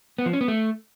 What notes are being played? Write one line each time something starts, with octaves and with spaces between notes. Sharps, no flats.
B3
F3
C#4
B3
A3